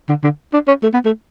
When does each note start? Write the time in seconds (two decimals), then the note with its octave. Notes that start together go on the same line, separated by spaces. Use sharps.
0.09 D3
0.24 D3
0.54 D4
0.68 C#4
0.83 A3
0.94 B3
1.06 A3